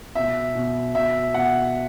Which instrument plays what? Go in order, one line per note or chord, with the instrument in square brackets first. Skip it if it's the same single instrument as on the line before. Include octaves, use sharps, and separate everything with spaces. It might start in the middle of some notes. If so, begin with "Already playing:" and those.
[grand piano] B2 E5
B2
B2 E5
B2 F#5